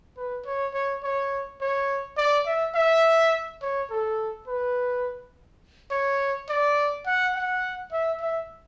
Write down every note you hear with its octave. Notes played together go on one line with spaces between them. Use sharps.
B4
C#5
C#5
C#5
C#5
D5
E5
E5
C#5
A4
B4
C#5
D5
F#5
F#5
E5
E5